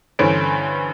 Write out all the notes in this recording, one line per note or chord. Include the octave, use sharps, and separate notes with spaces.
G2 D3 E3 C#4 C5 D7